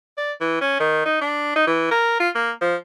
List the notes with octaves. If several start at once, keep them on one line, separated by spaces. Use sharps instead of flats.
D5
E3
C#4
D#3
D#4
D4
D#4
E3
A#4
F4
A#3
F3